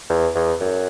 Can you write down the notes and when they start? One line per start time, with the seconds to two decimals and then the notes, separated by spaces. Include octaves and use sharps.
0.09 E2
0.35 E2
0.61 F#2